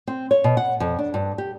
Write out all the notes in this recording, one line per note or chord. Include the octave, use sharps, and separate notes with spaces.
C4
C#5
B2
F#5
F2
D4
G2
G4